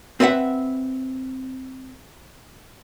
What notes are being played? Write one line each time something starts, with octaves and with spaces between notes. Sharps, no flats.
C4 B4 E5 F#5